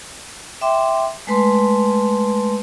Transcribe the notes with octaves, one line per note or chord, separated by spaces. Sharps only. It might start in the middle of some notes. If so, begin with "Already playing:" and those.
E5 G5 C6 D6
G#3 A3 B4 A5 C6